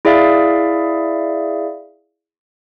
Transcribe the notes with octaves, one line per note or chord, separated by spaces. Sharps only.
E4 G#4 D5 E5 F5